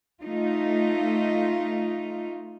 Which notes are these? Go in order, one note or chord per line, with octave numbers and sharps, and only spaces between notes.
A3 D#4 F4